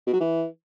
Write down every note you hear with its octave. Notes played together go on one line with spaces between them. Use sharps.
B2
F#3
E3